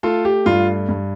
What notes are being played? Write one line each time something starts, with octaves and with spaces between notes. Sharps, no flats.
A3 F4 A4
G4
G2 F4
G2